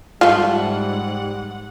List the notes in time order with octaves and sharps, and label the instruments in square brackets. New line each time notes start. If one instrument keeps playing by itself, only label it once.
[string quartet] G#2 F#5 [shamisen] F3 A3 [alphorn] G3 [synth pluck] F4